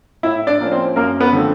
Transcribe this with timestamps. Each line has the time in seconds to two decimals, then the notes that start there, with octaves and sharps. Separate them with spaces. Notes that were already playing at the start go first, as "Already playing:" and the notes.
0.23 A2 E4 E5
0.47 D4 D5
0.59 F3 A#3 C#4
0.72 C4 C5
0.96 F#2 A#3 A#4
1.20 B3 B4
1.33 D3 F3 A3 C4